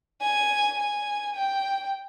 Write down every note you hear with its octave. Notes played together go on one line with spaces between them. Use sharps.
G#5
G#5
G5